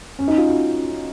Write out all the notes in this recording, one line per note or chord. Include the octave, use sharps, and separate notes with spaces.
C#4
D#4
F4
F#4